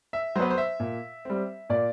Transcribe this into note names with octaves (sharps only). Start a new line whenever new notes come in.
E5
F#3 B3 B4 C5
C5
E5
A#2
G3 C4
A#2 D5